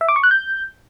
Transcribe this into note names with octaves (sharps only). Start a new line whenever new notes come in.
E5
D6
C#6
F#6
G6